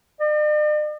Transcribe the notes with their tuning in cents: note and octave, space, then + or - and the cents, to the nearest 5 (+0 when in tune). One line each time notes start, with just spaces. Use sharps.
D5 +45